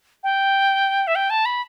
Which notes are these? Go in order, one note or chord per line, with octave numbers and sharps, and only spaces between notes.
G5
E5
G5
A5
B5